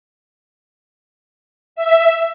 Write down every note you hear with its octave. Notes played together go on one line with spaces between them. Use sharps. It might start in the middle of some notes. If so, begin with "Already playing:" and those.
E5